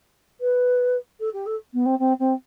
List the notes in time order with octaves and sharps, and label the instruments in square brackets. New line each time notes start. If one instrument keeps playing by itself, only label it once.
[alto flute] B4
A4
G4
A4
B3
C4
C4
C4